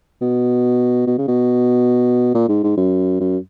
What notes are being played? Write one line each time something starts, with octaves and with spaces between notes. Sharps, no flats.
B2
B2
C#3
B2
A#2
G#2
G#2
F#2
F#2